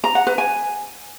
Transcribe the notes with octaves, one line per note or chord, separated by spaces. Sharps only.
A#5
F#5
B4
G#5